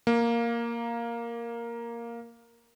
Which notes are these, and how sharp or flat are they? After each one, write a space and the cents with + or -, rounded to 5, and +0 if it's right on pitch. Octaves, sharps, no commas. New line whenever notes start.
A#3 +0